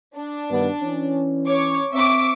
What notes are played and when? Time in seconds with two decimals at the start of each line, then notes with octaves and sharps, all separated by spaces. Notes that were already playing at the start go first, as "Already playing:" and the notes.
0.15 D4
0.50 G2 D#3 B3
0.81 E3 C#4
1.46 C#5 C#6 D6
1.93 C4 E5 C#6 D6